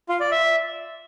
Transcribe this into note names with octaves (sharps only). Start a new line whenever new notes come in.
F4
D5
E5